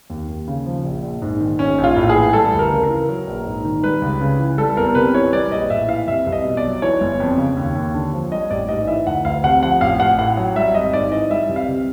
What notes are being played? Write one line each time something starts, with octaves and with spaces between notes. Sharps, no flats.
D#2
D#2
C#3
F3
A#1
A#1
G#2
D#3
A#1 C#4
A#1
F4
A2
G#4
E3
G3 A4
D2
A#4
C#3
A#4
E3
F#3
A#1
G#2
D#3
G3 B4
C#2
C#3
E3
G3 A4
E2 A#4
C3 B4
E3 C#5
G3 D5
A#1 D#5
A2 E5
E3 F5
C2 E5
C2
D#5
B2
D5
F#3
E3 C#5
G1
F2
C#3
D#2
D#2
D3
F3
G3 D#5
A1 D5
G#2 D#5
E3 E5
D2 F#5
D2 F5
C3 F#5
F3 F#5
A1 F5
A1 F#5
A2 F#5
F#3
G3 E5
G#1 D#5
G#2 D5
E3 D#5
G3 E5
C2
F5
C3